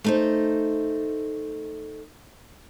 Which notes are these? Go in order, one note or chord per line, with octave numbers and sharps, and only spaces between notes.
A3 D#4 C5